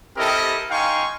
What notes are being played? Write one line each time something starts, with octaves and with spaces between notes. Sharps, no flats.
C4 E4 G4 A4 A#4 D#5
D#4 F5 G5 G#5 C6 C#6